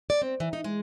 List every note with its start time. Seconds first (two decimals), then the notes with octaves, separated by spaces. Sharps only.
0.10 D5
0.22 C4
0.40 E3
0.53 D#4
0.64 G#3